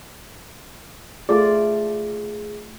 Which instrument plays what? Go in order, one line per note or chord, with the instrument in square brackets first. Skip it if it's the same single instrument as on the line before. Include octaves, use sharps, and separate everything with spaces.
[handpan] A3 F4 D5 [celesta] G#4